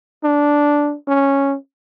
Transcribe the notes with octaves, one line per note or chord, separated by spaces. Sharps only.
D4
C#4